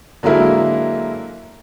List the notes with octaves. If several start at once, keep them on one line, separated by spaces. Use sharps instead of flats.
D3 F#3 G#3 A#3 E4